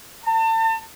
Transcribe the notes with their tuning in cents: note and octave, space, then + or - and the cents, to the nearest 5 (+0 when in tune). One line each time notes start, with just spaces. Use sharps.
A5 +35